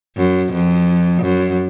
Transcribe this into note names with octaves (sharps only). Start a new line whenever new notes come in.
F#2
F2
F#2